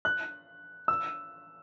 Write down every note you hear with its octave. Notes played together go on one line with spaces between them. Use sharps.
F#6
E6